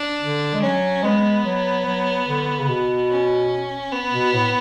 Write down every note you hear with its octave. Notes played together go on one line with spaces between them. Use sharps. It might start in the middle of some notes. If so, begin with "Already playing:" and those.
Already playing: D4
D3
G#3
F#3 C#4
G#3 B3
F#3
F#3
D3
C#3
B2
C#4
B3
B2
A2